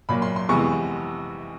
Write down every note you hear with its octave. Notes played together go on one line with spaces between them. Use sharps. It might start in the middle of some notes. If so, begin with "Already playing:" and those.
A#2 F#3 A#3 B5
C6
C6
F2 C3 E3 G#3 B3 C#6